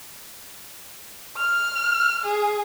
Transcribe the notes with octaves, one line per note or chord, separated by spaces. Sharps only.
F6
G#4